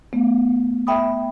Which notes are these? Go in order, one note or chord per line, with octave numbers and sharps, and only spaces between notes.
A3 B3
E5 G5 B5 D#6